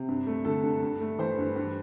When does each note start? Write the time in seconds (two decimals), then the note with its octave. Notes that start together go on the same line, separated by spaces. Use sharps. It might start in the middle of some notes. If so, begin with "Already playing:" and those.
Already playing: C3
0.08 G2
0.27 A3
0.45 D3 A4
0.64 G2
0.83 G2
1.01 A3
1.19 E3 C5
1.38 G2
1.56 G2